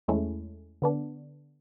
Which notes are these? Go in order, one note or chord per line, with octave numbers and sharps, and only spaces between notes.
E2 G#3 A3 C#4 E4
D3 B3 D4